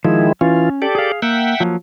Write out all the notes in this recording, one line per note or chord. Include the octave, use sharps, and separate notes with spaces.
D#3 F3 G#3 E4
E3 C#4 F4
G4 A4 D5
G#4 F5
A#3 E5 F#5 G5
F3 F#3 A#3